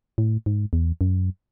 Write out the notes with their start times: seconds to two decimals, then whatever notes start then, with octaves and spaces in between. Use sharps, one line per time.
0.18 A2
0.46 G#2
0.73 E2
1.01 F#2